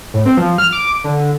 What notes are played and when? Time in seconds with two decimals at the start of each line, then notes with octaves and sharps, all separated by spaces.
0.14 A2
0.25 C4
0.37 F3
0.58 F6
0.73 D6
1.04 D3